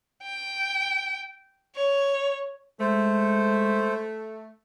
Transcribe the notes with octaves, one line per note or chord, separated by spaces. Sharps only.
G5
C#5
G#3 A3 C5